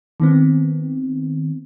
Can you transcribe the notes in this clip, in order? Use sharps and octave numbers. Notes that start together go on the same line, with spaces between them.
D#3 B3 C4